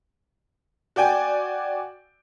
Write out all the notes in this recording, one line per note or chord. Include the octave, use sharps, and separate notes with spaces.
F#4 D5 G5 G#5